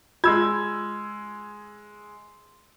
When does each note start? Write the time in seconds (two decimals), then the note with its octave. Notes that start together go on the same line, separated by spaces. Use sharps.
0.24 G#3 F4 E6 G#6